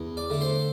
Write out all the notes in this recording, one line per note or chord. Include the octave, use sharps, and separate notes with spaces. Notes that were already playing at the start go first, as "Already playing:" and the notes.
Already playing: E2
D5 D6
D3 A3 D4
C5 C6